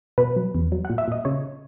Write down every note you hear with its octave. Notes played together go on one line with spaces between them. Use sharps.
B2 B4
F#3
E2
F#3
A#2 F#5
E5
A#2 D#5
C#3 C#5